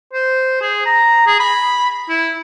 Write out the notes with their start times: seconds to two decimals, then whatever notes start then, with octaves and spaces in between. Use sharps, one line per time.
0.14 C5
0.61 G#4
0.86 A#5
1.27 G#4
1.40 B5
2.09 E4